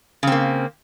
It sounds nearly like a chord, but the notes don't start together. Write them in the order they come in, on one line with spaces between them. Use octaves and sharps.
C#3 C4 A#3